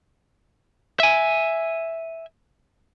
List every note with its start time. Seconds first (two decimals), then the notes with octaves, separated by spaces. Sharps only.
1.00 E5 G#5